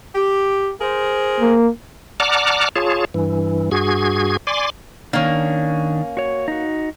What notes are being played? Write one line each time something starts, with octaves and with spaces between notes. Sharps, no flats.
G4
G#4 A#4 C5
A#3
D5 F#5 A5 A#5 D6 F6
F4 G#4 C#5 A5
G2 E3
G2 F#4 G#4 G#6
D5 G#5 C6 D6
D#3 A#3 C#4 D4
F#4 C#5
D#4 F#4